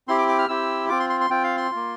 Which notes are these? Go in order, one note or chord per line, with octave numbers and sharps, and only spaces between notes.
C4 E4 G4 C6
D6
D6
F6
C4 E4 G4 E6
C4 F4 D6
C6
C6
C6
C4 F4 G5
F5
C6
A#3 F4